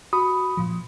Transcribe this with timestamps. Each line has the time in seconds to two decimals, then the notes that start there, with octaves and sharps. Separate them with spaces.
0.13 F#4 B5 D#6
0.57 A#2 F3